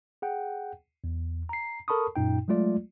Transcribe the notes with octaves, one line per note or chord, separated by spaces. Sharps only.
G#4 F#5 G5
E2
A#5 C7
A4 A#4 A5 B5 C#6 D#6
F#2 A#2 D#4 G5
F#3 G#3 A3 F4 D5